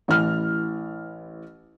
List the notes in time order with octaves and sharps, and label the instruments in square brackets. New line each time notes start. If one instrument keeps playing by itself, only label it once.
[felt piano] A1 E3 F6